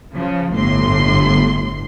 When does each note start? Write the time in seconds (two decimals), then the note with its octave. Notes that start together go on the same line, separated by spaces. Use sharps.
0.14 C#3 F3
0.55 G1 A2 C6